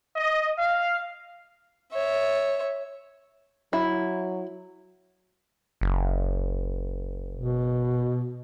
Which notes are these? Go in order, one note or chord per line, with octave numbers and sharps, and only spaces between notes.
D#5
F5
C#5 E5
F#3 E4
F#1
B2